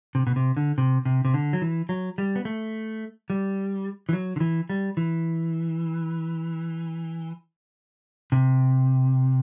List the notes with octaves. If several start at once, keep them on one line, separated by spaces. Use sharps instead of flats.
C3
B2
C3
D3
C3
C3
C3
D3
F#3
E3
F#3
G3
B3
A3
G3
E3
F#3
D3
E3
G3
E3
C3